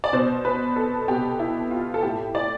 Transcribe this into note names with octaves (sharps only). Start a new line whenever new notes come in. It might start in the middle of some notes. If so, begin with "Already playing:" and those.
D5
B2 C5
B4
A4
B2 G4
E4
F4
A4
A2 G4
D5